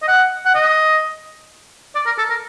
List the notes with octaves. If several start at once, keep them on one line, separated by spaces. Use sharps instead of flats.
D#5
F#5
F#5
D#5
D5
A#4
A4
A#4